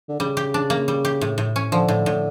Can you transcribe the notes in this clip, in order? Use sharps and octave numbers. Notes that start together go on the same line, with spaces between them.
D3
C#3 G3
G4
D4
A#3
G3
G4
A2
A2
C#4
D3 F3
A2
A2